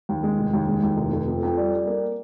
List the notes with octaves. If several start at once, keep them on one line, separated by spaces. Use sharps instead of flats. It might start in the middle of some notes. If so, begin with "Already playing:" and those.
D#2
G#3
F1
D#2
G#3
D#2
F1
F1
F2
F2
G3
G3
A#3